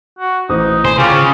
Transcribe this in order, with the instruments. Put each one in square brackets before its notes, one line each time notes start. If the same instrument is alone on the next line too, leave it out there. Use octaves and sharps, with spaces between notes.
[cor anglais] F#4
[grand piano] A1 C5 D#6 [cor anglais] D#4
[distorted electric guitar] C5 [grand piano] G#5
[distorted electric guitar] C#3 [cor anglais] F4 [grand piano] G5 C#6 D6